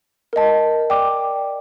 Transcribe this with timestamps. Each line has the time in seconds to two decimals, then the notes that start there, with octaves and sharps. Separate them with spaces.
0.33 A#4 D#5 A5
0.90 D5 G5 D6